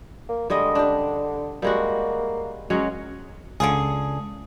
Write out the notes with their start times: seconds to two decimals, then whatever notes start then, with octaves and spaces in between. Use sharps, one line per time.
0.29 A#3
0.50 D3 G3 G#3 D#5
0.75 D4 G4
1.62 G3 G#3 A#3 F#4
2.70 F#3 G#3 C#4
3.60 C#2 D3 F4 G#4